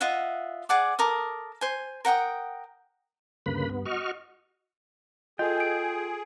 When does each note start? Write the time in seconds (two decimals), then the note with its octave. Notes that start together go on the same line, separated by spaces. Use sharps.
0.01 F4 D#5 E5 F#5
0.69 G#4 D5 F#5 D6
0.99 A4 A#4 D6 D#6
1.61 C5 G#5
2.05 A#4 F#5 G5 D#6
3.46 D2 G2 C#3 A#3 B4 B5
3.70 G2 B3
3.86 F#4 D#5 C#6 F6
5.39 F4 G#4 A4 D#5 G5
5.60 D7